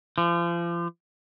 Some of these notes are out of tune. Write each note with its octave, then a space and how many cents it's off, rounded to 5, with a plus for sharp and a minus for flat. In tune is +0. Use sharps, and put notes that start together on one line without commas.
F3 -35